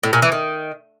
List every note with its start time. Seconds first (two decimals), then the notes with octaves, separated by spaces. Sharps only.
0.03 A2
0.13 A#2
0.22 E3
0.32 D#3